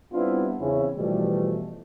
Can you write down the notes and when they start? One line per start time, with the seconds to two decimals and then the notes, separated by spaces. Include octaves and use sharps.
0.13 G3 B3 C4 D4 E4 F4
0.60 E2 C#3 C4 C#4 E4
0.97 B2 E3 F3 G3 A3